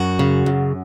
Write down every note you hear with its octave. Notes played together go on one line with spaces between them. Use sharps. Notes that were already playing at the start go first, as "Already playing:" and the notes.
Already playing: F#2 F#4
C#3
F#2